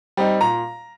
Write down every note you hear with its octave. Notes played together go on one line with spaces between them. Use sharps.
G3 C4 D#4
A#2 A#5